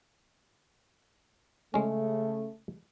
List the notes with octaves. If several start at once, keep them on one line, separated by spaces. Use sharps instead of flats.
C#3 G#3 A3 C#4